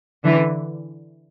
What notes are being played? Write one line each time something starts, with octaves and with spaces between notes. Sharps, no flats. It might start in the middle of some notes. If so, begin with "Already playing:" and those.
D3 E3